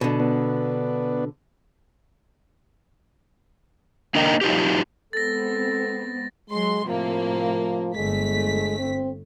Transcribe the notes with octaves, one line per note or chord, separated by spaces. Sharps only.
B2 D3
B3 D4
A#3 D4 D#4 A#4 D#5 G5
F#3 D#4 F4 G4
G#3 B3 C4 A4 A6 A#6
F#3 G#3 C6
A2 C3 F3 A#3
G1 G#3 A3 B6
C4